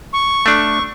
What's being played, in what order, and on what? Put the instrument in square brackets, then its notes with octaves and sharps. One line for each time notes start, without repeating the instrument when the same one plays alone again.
[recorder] C#6
[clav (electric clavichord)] A3 D4